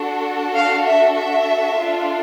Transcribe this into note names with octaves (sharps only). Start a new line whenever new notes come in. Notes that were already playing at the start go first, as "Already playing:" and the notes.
Already playing: D4 F#4 A4
F5
E5
E5
D4 F4 A4